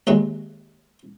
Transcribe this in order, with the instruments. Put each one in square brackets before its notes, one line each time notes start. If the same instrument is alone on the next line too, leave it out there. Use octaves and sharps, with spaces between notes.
[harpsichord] D#2 F#3 G#3